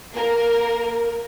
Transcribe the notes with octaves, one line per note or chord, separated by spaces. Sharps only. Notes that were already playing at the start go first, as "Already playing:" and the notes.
A#3 A#4